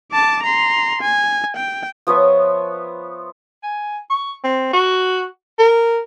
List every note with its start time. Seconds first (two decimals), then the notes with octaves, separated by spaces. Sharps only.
0.11 A5 D6
0.43 A#5 C6
1.02 G#5
1.57 G5
2.07 F3 B3 C#5 E5
3.63 G#5
4.10 C#6
4.44 C4
4.73 F#4
5.59 A#4